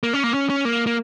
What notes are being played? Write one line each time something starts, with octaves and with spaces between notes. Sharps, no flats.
A#3
C#4
A#3
C#4
C#4
A#3
A#3